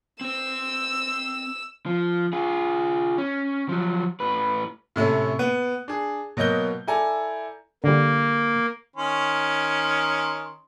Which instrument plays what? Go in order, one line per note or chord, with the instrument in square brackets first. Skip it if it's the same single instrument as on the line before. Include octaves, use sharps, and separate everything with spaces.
[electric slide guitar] C4 C5 [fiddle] E6
[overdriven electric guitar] F3
F4 G#4
C#4
F3 F#3
A2 B4
[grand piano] A2 C3 A3 C#4
B3
D4 G#4
B2 F#3 A#3 D#5 G6 G7
E4 A4 D5 G#5 A#5
[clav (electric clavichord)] D3 G3 [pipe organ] A#3
[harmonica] D#3 C#4 C6